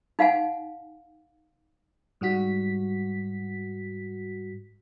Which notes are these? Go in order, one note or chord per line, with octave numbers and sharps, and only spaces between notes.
D#4 F5 F#5 G#5
G#2 G3 F#4 B6